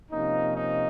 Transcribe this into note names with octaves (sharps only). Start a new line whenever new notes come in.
C3 F3 A#3 C#4 D#4
D#4